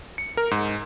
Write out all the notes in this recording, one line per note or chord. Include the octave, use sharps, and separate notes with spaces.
C#7
A#4
G#2